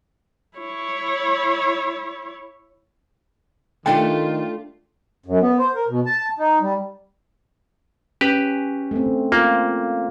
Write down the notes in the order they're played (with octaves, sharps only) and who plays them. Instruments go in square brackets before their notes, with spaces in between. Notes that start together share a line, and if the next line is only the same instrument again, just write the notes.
[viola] E4 C#5
[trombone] D#3 [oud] A3 D4 G4 [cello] F4 [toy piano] G5
[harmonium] F#2
B3
C5
A#4
B2
A5
D#4
G3
[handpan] C#4 [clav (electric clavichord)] G4 B4
[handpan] A3 C4
[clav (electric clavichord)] A#3 [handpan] F4